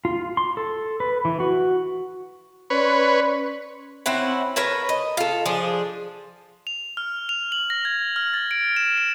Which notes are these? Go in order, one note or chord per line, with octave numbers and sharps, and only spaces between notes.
F4
C6
A4
B4
E3
F#4
C#4 B4 C#5 D5 C6
C4 C#4 E4 F#5
A#4 B4 C#5 A5
D#5
F4 A4
F3 D4 G#4
F7
F6
F7
F#7
A#6
G#6
F6
A6
D7
E7
D7